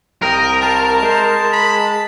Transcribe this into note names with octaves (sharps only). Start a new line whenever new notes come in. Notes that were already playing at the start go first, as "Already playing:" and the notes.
C2 A#4 D#5 G5
F4 A5
G#3 C5
B5